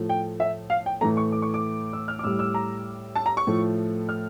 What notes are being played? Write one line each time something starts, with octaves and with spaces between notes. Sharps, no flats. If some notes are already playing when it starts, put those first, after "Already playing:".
Already playing: A2 F3 A3
G5
E5
F5
G5
A2 E3 A3 A#5
C#6
D6
C#6
D6
E6
F6
D6
A2 G3 E6
E6
A#5
A5
A#5
C#6
A2 F3 A3
F6